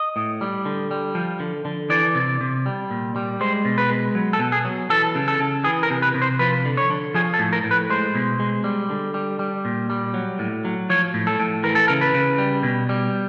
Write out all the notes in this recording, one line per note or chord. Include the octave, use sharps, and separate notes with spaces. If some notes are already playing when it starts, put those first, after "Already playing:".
Already playing: D#5
A2
G3
D3
G3
F3
D3
D3
E3 D5
C3
C3
G3
A#2
G3
G#3 C5
B2
B4
G#3
F#3
A4
B2
G#4
F#3
E3 A4
C#3
A4
C#3
E3 G#4
A#4
C3
B4
C3
C5
F3 B4
D3
C#5
D3
F3 G#4
A4
A2
A#4
A2
B4
G#3 C5
B2
G#3
G3
D3
G3
G3
A#2
G3
F#3
A2
F#3
F3 C#5
A2
A4
A2
E3 A#4
A4
C#3 A#4
B4
C#3
G3
B2
G3